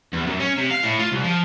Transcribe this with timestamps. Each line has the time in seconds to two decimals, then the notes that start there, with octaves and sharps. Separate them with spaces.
0.13 E2
0.27 F#2
0.40 C#4
0.58 C3
0.71 F5
0.83 A2
1.00 F4
1.12 C2
1.24 F3